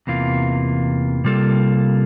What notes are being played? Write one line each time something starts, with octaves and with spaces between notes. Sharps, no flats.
E2 C3 E3 A#3 F4
C3 G3 A#3 F4 A4